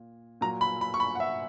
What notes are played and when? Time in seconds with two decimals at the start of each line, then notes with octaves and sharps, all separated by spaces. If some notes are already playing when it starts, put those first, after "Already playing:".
Already playing: A#2
0.41 A#2 F#3 A#5
0.61 B5
0.81 B5
0.94 C#6
1.00 B5
1.15 F#5
1.20 E5